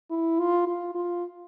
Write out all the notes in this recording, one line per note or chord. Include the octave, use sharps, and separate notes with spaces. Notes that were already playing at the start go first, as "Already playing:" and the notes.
E4
F4
F4
F4